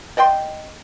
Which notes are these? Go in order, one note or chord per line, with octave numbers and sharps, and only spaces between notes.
D5 D#5 G5 C6